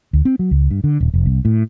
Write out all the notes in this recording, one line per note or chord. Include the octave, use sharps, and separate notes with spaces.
D2
C4
F#3
C#2
G2
D3
D#1
F1
C2
A2